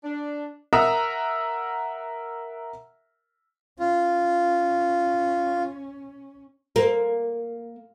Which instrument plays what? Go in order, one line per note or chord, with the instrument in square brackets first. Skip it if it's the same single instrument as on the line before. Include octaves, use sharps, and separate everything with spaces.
[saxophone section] D4
[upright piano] A#4 E5 F#5 A#5 D#6 E6
[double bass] C#4 [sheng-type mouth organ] F4
[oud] A#3